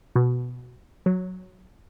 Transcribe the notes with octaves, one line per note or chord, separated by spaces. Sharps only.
B2
F#3